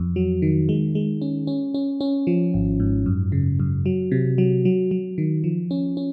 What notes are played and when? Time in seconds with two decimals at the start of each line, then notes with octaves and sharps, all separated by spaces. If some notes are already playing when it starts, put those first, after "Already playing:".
Already playing: F2
0.16 F#3
0.42 D#3
0.69 G#3
0.95 G#3
1.22 C#4
1.47 C#4
1.74 C#4
2.01 C#4
2.27 F3
2.54 G#1
2.80 G#2
3.06 F#2
3.32 C#3
3.60 F#2
3.86 F#3
4.12 C3
4.38 F#3
4.65 F#3
4.91 F#3
5.18 D#3
5.44 F3
5.71 C#4
5.97 C#4